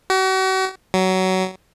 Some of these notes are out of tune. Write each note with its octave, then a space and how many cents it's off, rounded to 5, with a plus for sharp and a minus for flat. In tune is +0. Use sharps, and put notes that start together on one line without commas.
F#4 +40
F#3 +20